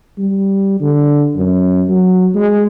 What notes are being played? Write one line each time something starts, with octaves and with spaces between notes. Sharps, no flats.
G3
D3
F#2
F#3
G#3